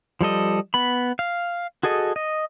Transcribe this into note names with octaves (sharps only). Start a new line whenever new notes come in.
F3 G3 A4 D#5
B3 B5
F5
F#4 G#4 A4 D#5
D#5